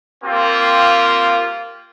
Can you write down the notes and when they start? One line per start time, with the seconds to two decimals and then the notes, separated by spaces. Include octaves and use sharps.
0.23 A#3 C4 F4 G4